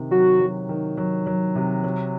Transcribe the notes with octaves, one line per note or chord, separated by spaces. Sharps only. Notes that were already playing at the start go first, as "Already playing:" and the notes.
Already playing: C3 D#3
F#3 F#4
F#3
D#3
F#3
F#3
C3
F#3